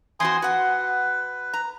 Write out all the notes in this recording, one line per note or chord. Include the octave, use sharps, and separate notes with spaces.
E3 C4 F#4 G#5 C6 D#6
F#4 B4 F#5
A#5